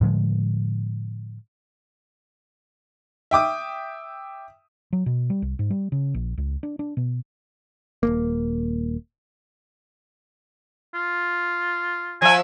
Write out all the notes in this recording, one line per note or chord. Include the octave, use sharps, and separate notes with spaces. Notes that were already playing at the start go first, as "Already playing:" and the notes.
A2 D3 F3 G#3
E5 G5 D6 D#6
F#3
B2
G3
C2
G#2
G3
C#3
A#1
C#2
D4
D4
B2
D#1 G#1 A#3
F4
F3 E5 G#5